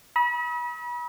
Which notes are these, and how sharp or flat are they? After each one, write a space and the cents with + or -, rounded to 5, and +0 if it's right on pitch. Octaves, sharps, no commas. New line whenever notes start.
B5 -35 D#6 +45